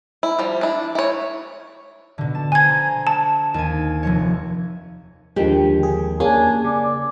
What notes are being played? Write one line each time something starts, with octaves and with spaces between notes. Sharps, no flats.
E4
F3 G3
D4 E4
E4 C#5
B2 D3
A5
C5 G#5 A#5 G#6
A5
D#2 G#5
F1 F3 C#5
D#2 D3 F3 G#3 G4
G#4
A#3 C#4 D4 G#4 G#5 A5
C#3 D5 D6